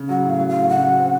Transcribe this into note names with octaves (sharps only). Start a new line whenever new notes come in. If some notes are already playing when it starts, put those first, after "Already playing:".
Already playing: C#3
F#3 F#5
A2 F5
F#3
F5
A2
C#3 F#5
F#3
C4